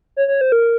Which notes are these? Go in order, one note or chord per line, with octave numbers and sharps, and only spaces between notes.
C#5
C#5
C5
A#4